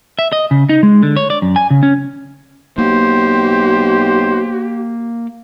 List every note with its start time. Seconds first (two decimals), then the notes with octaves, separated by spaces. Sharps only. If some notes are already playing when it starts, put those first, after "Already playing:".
0.19 E5
0.32 D#5
0.51 C#3
0.69 D#4
0.83 G#3
1.03 D3
1.16 C#5
1.30 D5
1.42 F#2
1.56 G#5
1.71 C#3
1.83 C#4
2.78 B1 A#3 G4 C5